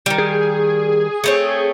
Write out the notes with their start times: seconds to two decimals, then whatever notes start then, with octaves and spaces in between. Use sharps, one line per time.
0.06 D#3 G3
0.18 G#4
1.24 A3 C4 C#5